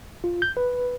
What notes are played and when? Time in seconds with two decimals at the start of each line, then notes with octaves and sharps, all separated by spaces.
0.24 F4
0.42 G6
0.57 B4